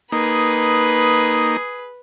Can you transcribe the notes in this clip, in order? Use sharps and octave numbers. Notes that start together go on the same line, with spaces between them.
A#3 D#4 G#4 B4